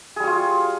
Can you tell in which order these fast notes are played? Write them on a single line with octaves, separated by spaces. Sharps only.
G#4 G3 F#4 F4